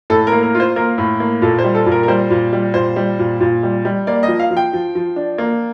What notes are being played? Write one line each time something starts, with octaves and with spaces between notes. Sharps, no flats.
A2 A4
A#4
A#3
A#4
F4
C5
A#3 A#4
A2
A#3
A#2 A4
C5
G3
A4
A#2
A#4
A#4
G3 C5
A#2
G3
A#2 C5
G3
A#2
A#2
G3
G3
A#3 D5
D#5
F3
F5
F3
G5
F3
F3
D4
A#3